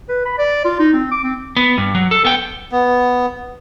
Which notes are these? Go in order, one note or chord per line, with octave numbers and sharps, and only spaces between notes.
B4
B5
D5
F4
D#4
C4
D6
C4
B3
G2
F#3
A4
B3 G5
B3